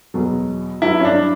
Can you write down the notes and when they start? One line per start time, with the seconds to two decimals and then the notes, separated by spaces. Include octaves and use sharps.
0.14 E2 B2 F#3
0.82 G2 F#3 E4
1.00 C#4
1.05 D4